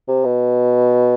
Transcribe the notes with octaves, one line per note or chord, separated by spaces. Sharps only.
C3
B2